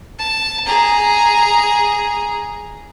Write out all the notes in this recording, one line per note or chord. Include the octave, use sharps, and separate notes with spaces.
A5
G#4 A#5